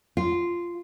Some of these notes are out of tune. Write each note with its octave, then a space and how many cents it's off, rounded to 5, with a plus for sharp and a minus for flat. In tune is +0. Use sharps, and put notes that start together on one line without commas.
F4 -10